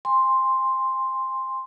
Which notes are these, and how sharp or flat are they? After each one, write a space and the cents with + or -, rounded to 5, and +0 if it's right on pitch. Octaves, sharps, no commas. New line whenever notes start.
G#5 -30 C6 +0